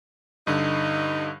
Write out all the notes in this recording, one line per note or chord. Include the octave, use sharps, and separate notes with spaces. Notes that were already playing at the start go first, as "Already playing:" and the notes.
G2 D3 D#4